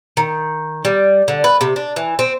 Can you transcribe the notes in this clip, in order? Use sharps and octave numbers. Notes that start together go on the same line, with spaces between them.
D#3
G3
D3
B4
C3
D4
E3
C4